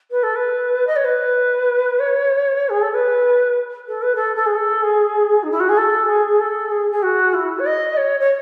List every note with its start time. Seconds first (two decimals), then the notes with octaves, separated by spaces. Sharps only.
0.11 B4
0.23 A4
0.35 B4
0.87 D#5
0.96 C#5
1.04 B4
1.99 C#5
2.69 G#4
2.81 A4
2.94 B4
3.88 A4
4.02 B4
4.15 A4
4.35 A4
4.46 G#4
4.56 A4
4.82 G#4
5.43 D#4
5.51 E4
5.60 F#4
5.69 G#4
5.77 A4
6.08 G#4
6.40 A4
6.71 G#4
6.92 G#4
7.02 F#4
7.33 E4
7.59 C#5
7.66 D#5
7.97 C#5
8.20 C#5